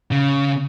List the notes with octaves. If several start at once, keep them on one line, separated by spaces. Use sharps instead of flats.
C#3